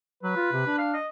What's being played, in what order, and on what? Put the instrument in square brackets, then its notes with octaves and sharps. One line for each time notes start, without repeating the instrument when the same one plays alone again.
[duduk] F#3 [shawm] B4
[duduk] F4
C3
D4
[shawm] F5
D#5